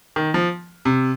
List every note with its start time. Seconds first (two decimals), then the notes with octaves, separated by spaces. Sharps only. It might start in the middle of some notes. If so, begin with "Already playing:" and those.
0.16 D#3
0.34 F3
0.85 C3